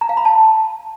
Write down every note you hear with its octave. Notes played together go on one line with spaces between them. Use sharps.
A#5
F5
B5
A5